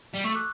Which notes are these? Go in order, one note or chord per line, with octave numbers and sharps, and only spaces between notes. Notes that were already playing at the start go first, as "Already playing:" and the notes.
G3
A3 C#6 E6
D6 F#6